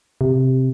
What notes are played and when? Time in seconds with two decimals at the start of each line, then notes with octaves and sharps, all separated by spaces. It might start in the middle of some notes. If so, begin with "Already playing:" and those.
0.21 C3